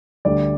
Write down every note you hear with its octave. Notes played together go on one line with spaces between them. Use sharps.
D2 D3 G3 D5